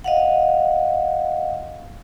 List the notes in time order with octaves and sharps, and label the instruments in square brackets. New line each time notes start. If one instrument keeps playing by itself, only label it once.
[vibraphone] D#5 F5 F#5